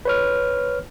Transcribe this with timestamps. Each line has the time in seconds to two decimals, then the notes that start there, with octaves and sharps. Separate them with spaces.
0.05 B4 C#5 F6